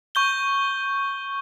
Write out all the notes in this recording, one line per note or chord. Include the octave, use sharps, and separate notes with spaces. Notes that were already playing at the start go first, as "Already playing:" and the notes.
C#6 G6 G7